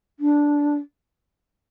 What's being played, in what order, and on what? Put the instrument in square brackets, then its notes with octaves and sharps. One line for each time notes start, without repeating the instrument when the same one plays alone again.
[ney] D4